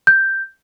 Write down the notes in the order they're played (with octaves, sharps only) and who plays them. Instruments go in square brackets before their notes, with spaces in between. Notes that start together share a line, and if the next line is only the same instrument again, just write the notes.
[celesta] G6